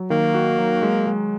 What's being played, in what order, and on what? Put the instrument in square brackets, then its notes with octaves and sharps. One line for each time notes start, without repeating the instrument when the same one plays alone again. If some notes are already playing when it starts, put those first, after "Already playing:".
Already playing: [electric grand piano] F#3
[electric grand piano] D#3 [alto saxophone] A#3
[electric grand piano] F#4
F#3
G#3
G#3